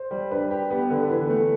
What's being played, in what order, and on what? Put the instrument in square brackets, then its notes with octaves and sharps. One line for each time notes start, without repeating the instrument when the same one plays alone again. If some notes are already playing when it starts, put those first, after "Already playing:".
Already playing: [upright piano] C5
[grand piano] G3
[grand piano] D4 [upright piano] B4
[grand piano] G4
B3
D3
[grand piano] E3 [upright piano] B4
[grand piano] A3